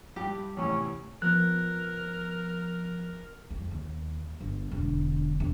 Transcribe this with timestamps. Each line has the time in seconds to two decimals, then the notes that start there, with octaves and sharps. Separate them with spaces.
0.16 G2 G3 G4
0.57 E2 A2 C3 C#4
1.22 F3 B3 A#4 F#6
3.51 F2
3.71 D#2
4.41 G1
4.72 E1 D3
5.40 E1